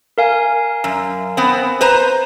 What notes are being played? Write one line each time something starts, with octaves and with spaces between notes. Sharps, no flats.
A#4 F5 G#5
F#2
B3 C4
B4 C5 A#5